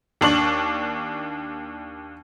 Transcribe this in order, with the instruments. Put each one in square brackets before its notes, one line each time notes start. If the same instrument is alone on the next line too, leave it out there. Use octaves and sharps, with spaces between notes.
[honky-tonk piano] D#2 D4 C#6 F#7